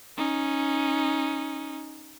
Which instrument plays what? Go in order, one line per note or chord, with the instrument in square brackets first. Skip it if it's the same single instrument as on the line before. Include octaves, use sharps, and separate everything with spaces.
[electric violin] C#4 D#4